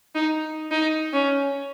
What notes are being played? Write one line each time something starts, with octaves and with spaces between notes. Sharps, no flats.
D#4
D#4
C#4